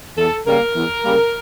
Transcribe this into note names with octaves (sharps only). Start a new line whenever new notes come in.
E2 A4
C#3 G3 A#3 A#4
E2
C#3 G3 A#3